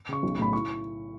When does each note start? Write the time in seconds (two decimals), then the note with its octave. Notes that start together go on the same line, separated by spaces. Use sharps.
0.09 C#3 C#6
0.23 B1
0.38 A2 B5
0.53 E4 C#6